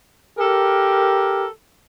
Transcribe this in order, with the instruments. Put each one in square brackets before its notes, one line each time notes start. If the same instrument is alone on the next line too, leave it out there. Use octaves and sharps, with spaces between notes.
[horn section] G4 A4 A#4